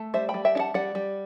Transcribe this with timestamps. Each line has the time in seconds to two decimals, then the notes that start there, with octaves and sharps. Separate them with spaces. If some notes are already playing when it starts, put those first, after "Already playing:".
Already playing: A3
0.14 G3 C5 E5
0.29 G5 B5
0.34 G3
0.45 E5 G5
0.55 D4
0.59 F#5 A5
0.74 G3 D5 F#5
0.95 G3